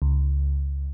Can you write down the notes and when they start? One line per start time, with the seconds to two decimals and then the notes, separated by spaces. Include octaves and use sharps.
0.02 C#2